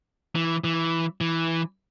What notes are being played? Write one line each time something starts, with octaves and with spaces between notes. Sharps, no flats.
E3
E3
E3